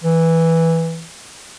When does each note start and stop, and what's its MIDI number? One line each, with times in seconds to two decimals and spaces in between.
0.04 1.05 52